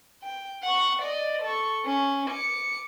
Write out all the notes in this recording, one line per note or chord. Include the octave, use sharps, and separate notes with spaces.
G5
F#5 C#6
D5 D#5
A4 C#6
C#4
D6 C#7